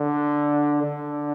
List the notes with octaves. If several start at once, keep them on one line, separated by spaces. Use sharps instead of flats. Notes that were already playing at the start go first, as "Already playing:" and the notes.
Already playing: D3
D3